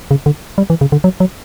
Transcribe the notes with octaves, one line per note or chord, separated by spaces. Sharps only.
C#3
D3
G3
E3
C#3
D3
F#3
F#3